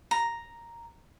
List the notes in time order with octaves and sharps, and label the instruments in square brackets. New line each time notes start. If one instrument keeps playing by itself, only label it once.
[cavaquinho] A#5